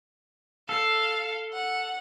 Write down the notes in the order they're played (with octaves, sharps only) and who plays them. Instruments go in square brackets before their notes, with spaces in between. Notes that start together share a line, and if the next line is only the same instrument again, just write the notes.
[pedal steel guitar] A4 [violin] F5
[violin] F#5